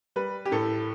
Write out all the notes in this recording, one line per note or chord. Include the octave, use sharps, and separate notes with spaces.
G3 B4
G4
A2 A4